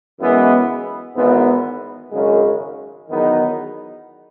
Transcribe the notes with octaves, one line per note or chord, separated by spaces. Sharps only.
F#2 E3 G#3 B3
G#1 G#2 E3 B3
G#1 F#2 C#3 G#3
E2 D#3 F#3 B3 D#4